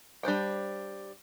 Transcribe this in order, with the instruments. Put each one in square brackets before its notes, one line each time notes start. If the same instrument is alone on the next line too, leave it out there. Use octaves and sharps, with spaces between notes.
[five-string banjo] G3 D4 C5 G5